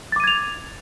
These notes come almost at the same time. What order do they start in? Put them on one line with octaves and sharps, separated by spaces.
A6 D6 D#7 G#6 F7